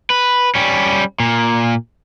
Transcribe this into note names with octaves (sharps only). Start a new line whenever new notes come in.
B4
G3 C#4
A#2